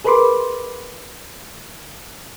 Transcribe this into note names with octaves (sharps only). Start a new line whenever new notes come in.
G#4 A#4 B4 B5 C6 D6